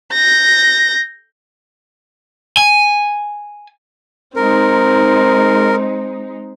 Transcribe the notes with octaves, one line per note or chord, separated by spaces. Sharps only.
G6 A#6
G#5
G#3 C4 D#4 A#4